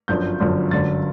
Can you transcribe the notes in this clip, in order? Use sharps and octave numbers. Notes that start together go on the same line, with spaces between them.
G1 F#2 D3 F3 G6
G1 F#2 D3 F3
G1 F#2 D3 A6